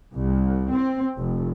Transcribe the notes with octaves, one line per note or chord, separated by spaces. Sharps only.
C2
C4
F1